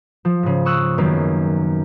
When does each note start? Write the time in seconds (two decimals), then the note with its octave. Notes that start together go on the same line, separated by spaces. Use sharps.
0.25 F3
0.43 G#2 C#3
0.65 C#6 D#6 E6 F#6
0.98 F#2 D#3 A#3 B3